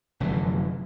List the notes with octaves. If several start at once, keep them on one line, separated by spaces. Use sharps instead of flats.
F1 F#2 D3 E3